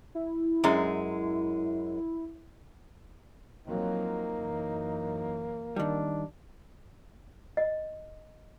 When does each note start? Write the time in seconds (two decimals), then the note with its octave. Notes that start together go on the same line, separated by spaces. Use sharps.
0.15 E4
0.64 F#2 G#3
3.67 F3 F#3 A#3 C4 D#4
4.39 F#2 E3
5.76 D#3 G3 D4
7.57 D#5